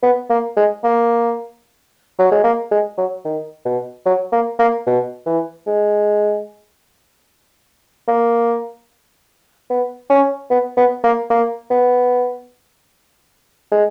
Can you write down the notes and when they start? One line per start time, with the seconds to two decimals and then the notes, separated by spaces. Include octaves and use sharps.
0.03 B3
0.30 A#3
0.57 G#3
0.84 A#3
2.18 F#3
2.31 G#3
2.44 A#3
2.71 G#3
2.98 F#3
3.25 D#3
3.65 B2
4.06 F#3
4.32 A#3
4.59 A#3
4.87 B2
5.26 E3
5.67 G#3
8.08 A#3
9.70 B3
10.10 C#4
10.50 B3
10.77 B3
11.04 A#3
11.30 A#3
11.71 B3
13.72 G#3